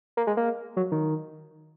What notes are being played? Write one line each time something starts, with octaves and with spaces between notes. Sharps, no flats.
A#3
G#3
A#3
F#3
D#3